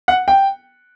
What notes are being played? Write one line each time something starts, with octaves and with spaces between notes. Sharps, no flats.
F#5
G5